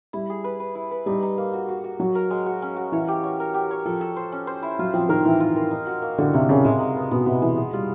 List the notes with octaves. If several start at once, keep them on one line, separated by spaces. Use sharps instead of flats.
G3 E4
G#4
B4
B4
E4
B4
G3 D#4
D#4
A#3
F#4
F#4
F#4
F#3 F#4
A#4
G#3
F#4
C#4
F#4
E3 C#5
G4
C#5
A#4
G4
C#5
F3 A4
A4
C5
C#4
C5
E4
F#3 F4
F3 C4
D#3 A#4
E3 C4
F4
A#4
D#4
F#4
A#3
D3 F#4
C3 A#3
C#3 A#3
C3 G#3
D#4
B3
B2 B3
C3 B3
E3 G#3
G#3
G3 F4